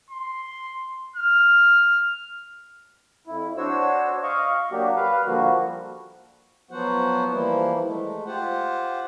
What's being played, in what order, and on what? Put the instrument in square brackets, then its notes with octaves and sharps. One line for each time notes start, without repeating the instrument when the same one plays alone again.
[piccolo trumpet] C6
F6
[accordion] F2 E4
D4 F#4 C5 C#5 E6
D#5 F5 C#6
F#3 A#3 D4 F#4 G4
B4 F5
D3 F3 G3 A#3 F#4
[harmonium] F3 F#3 B3 F#4 C5 F#5
E3 F3 G3 A#3 E4
G#3 A3
F4 G4 C5 F#5